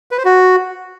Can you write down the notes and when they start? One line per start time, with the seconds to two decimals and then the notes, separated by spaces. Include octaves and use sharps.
0.11 B4
0.18 C5
0.25 F#4